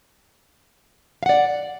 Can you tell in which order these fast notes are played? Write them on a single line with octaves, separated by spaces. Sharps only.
F5 F#5 D5